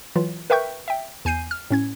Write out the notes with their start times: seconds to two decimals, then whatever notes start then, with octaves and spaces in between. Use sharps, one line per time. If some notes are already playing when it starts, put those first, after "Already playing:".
0.16 E3 F#3 F4
0.50 A#4 B4 E5 G5 C#6 G6
0.88 E5 G5
1.25 E2 G#5 G6 C7 D#7
1.51 F6
1.70 A2 C#4 G#6